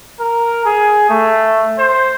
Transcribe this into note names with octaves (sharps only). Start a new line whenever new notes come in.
A#4
G#4
A3
C5